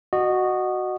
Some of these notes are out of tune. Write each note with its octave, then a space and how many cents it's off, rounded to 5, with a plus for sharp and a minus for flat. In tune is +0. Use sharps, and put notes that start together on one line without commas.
F#4 +0 D#5 -25